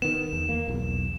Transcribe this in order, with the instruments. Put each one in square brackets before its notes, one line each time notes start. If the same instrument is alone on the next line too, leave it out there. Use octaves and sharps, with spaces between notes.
[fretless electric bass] D#3 B3 [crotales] E7
[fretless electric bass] E2
A#3
B1 E2